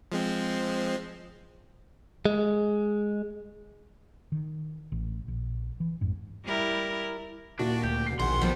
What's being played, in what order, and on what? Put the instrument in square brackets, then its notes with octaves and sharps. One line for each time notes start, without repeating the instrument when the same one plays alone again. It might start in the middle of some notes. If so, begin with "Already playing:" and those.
[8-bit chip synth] F3 G#3 C4
[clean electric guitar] G#3
[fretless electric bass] D#3
A1
A#1
E3
A1 F2 G#2
[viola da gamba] G3 E4 A#4
[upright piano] D#1 A#2 E4 [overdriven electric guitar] D4 [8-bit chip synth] F#4
[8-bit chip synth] D2 [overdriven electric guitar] G4
[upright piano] E1 C7
[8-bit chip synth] A#1 D#3 F#5 [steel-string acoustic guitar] G#4 [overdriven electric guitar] C6
[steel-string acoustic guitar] F3 B3 [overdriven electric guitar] G3